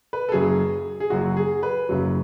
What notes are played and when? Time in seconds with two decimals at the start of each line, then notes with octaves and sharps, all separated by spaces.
0.13 B4
0.29 A4
0.32 F#1 F#2 C#3 F#3 G#4
1.00 G#4
1.10 F#1 F#2 C#3 F#3 F#4
1.37 G#4
1.63 B4
1.89 F#1 F#2 C#3 F#3